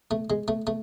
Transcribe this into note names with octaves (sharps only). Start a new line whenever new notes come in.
A3
G#3
A3
A3